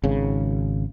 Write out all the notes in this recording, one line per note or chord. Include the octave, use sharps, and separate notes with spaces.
G#1 C#3